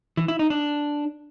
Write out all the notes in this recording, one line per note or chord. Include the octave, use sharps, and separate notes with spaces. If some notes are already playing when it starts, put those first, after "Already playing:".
E3
E4
D#4
D4